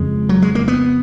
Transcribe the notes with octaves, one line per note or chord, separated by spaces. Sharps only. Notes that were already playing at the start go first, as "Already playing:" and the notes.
Already playing: F2 C#3 G#3
F#3
G#3
A#3
B3